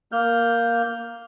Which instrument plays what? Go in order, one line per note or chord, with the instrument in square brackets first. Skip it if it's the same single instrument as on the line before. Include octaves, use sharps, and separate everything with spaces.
[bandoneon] A#3 F6 G6